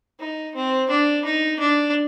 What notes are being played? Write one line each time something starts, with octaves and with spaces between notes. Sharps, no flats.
D#4
C4
D4
D#4
D4